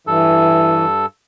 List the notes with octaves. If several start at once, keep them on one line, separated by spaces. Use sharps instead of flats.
G2 E3 A4